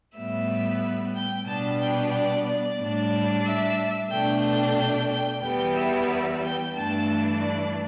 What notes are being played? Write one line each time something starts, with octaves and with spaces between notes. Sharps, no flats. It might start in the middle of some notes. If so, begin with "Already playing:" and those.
A2 G3 B3 E5
G5
B2 G3 B3 D4 A5
G5
D5
D5
A2 G3 D4
E5
B2 A3 D4 G5
G5
G5
G5
E2 E3 G3 B3 G5
E5
E5
G5
G2 E3 A3 D4 A5
D5